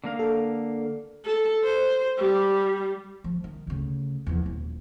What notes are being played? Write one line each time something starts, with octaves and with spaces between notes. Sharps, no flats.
D3 A#3 F5
A4
A4
C5
G3
F3
D#3
D2 C#3
E2 F3
D#1